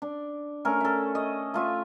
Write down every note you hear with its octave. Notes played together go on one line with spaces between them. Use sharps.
D4
A3 C#4 A4 A#4
A4 E5
D#5
A3 F4 E5